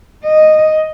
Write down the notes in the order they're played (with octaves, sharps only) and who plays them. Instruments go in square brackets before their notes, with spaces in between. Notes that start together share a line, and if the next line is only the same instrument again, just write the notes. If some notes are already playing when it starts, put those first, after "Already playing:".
[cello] D#5